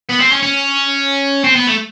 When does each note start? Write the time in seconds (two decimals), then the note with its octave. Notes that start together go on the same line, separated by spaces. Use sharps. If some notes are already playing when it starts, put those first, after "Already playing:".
0.09 B3
0.20 C4
0.32 C#4
0.43 C#4
1.44 C4
1.56 B3
1.67 A3